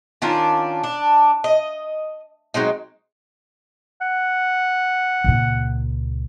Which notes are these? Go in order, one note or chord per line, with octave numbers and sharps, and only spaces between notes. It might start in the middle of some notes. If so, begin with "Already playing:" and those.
D#3 C#4 D4 F4
D4
D#5
F#3 G#3 C4 D#4
F#5
C#2 A#2